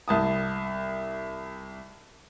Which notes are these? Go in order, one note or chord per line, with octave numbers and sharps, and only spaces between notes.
C2 A5 D#6